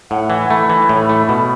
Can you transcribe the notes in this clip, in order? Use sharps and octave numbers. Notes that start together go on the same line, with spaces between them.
A2 F#5
E3
A3 B5
E3
A2
A3
B2